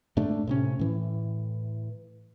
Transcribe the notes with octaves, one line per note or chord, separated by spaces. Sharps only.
G#2 A3 D4
A2 C3 C#4
A2 E3